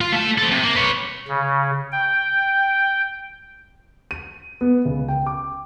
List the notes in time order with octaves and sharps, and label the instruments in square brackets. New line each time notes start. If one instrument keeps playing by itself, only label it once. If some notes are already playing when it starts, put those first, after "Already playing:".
[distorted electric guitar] F4
A3 A5
C4 A4
C3
A#3
B4 C#5
[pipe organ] C#3
G5
[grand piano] D#7
B3
C#2
G5
D6